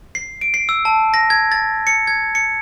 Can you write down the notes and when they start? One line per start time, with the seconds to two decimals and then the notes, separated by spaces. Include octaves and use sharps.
0.15 C7
0.41 D7
0.54 C7
0.69 E6
0.85 A5
1.14 A#6
1.30 G#6
1.52 A6
1.87 C#7
2.07 G#6
2.35 C#7